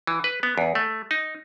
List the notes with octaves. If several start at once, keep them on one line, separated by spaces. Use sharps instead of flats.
E3
B4
B3
E2
A3
D#4